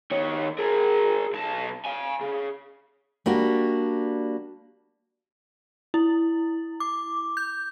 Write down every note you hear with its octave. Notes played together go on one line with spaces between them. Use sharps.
D#3 C#5
G#4 A#4
B1 A5
F5 G#5
C#3
G3 A#3 D4 F#4
E4
D6
G6